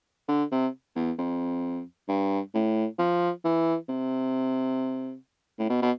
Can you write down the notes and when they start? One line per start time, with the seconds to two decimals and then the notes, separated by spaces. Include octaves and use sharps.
0.28 D3
0.52 C3
0.96 E2
1.19 F2
2.09 G2
2.54 A2
2.99 F3
3.45 E3
3.89 C3
5.59 A2
5.70 B2
5.82 B2